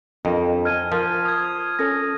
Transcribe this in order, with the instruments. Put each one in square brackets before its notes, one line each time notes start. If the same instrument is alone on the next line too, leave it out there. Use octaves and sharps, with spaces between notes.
[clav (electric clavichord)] F2 [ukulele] D4 A#4 D#5
[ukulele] D#5 G#5 [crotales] F6 G#6 D#7
[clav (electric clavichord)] F3 [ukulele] A#4
[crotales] D#6 G#6
[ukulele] C#4 A4 C#5 [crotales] A#6